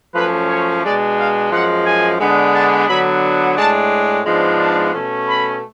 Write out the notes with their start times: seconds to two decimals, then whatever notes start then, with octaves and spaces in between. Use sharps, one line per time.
0.15 F#2 F3 A3 C#4 B4
0.50 C#5
0.83 B2 G#3 D4 D5
1.18 F5
1.52 F#2 F3 G#3 F#5
1.86 G#5
2.20 D3 G#3 B3 D4
2.55 A5
2.88 D3 F#3 B3 D4 B5
3.57 A2 G#3 D4 A5
4.25 G#2 F3 G#3 B3 D4
4.59 A5
4.93 B2 A3 C#4
5.27 B5